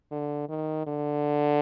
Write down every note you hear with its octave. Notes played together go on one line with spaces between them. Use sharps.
D3
D#3
D3